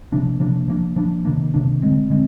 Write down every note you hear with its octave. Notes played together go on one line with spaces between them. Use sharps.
C3 F3 A#3 D4
C3 F3 A#3 D4
F3 A#3 D4
F3 A#3 D4
C3 D#3 A#3 D4
C3 D#3 A#3 D4
D3 G#3 C4
D3 G#3 C4